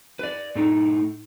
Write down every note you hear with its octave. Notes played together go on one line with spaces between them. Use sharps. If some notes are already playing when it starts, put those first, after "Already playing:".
B4 D5
A2 A3 D#4